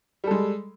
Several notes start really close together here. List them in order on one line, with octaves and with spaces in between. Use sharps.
G3 A4 G#3